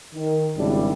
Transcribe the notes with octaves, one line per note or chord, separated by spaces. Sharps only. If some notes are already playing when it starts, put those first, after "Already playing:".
D#3
G#1 C#3 G3 D4 E4